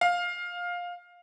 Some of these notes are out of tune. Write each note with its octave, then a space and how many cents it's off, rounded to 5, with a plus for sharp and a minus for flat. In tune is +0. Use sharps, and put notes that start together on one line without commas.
F5 +15